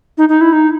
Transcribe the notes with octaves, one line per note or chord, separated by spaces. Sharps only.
D#4
D#4
E4
D#4